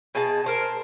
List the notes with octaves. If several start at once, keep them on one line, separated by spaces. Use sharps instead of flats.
B2 G#4 D#5 A5
A#4 C5 A5